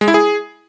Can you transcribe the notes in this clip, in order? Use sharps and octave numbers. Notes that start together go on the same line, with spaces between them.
G#3
E4
G#4